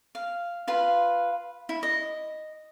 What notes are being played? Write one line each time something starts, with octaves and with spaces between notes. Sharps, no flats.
F5
F4 B4 F5
E4
D#5